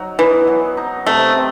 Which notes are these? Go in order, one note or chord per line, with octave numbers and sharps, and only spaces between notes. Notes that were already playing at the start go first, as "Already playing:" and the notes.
Already playing: F#3 D#4
E3 B3
F#3
D#4
C3 A3
C4